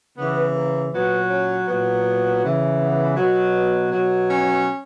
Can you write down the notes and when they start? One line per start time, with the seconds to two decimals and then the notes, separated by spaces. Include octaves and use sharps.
0.18 C#3 E3 B3
0.56 A#3
0.93 A#2 F#3 B3
1.30 C#4
1.68 A#2 F#3 B3
2.43 C#3 E3
2.80 B3
3.17 B2 F#3
3.54 B3
3.92 B2 F#3
4.29 C#4